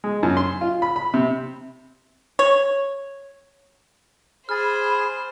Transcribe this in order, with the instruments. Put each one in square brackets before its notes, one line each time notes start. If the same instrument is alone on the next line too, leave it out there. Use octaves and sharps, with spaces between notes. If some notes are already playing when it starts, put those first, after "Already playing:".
[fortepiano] G#3
F#2
C6
F4
B5
B5
C3
[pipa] C#5
[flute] G#4 [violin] C5 [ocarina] B5 [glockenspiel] F6 A6